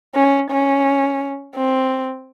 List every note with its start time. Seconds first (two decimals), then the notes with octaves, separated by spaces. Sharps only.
0.15 C#4
0.51 C#4
1.55 C4